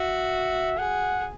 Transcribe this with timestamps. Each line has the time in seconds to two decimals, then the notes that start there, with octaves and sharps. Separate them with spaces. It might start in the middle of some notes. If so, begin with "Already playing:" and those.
Already playing: F#4 E5
0.78 G#4 F#5